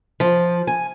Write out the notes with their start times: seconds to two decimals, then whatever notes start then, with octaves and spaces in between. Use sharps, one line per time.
0.20 F3
0.67 G#5